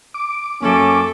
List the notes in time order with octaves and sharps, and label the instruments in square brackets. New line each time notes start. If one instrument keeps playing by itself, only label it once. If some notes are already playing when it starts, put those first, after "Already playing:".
[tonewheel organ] D6
[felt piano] F#2 A#3 [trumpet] C#4 [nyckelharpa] A4 E5